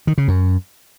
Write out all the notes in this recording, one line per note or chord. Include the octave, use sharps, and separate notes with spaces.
D#3
C#3
F#2